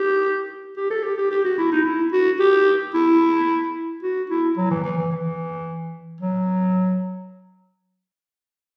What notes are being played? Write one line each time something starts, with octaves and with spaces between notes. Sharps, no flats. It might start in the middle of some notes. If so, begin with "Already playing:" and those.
Already playing: G4
G4
A4
G4
G4
G4
F#4
E4
D#4
E4
F#4
G4
E4
F#4
E4
F#3
E3
E3
E3
E3
F#3